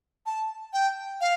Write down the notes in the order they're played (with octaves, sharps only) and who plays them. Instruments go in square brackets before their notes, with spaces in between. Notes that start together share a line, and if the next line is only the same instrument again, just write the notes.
[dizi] A5
G5
F5